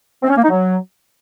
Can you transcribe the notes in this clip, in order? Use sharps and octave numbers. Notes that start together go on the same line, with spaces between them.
C4
C#4
A#3
D#4
F#3